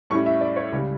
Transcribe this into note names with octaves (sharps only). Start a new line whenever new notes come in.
A2 G3 C#4 E4 C#6
E5
D5
C#5
C#2 C#3 G3